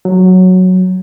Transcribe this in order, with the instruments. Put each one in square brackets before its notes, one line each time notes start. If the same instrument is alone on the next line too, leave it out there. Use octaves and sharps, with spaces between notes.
[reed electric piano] F#3